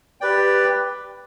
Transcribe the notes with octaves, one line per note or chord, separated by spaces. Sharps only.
G4 B4 D5 G5